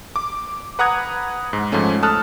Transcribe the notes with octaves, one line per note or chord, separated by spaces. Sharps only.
D6
B4 F#5 A#5 D#6 F#6 G#6
G#2
G#2 F3 A3 C#4
A4 A5 D#6 F6 F#6